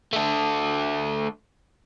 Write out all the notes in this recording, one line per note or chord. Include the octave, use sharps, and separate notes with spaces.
A3 D4